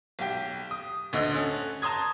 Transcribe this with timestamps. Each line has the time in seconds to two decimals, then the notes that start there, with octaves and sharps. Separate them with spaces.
0.19 B1 G4
0.71 D#6
1.13 D2 D3 D#5 C6 F#6
1.35 C#4 A4
1.82 A5 A#5 C6 D#6 G#6